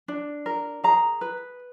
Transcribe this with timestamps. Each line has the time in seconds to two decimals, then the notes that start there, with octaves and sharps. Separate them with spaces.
0.08 D4
0.46 A#4
0.84 G#4 A#5
1.21 B4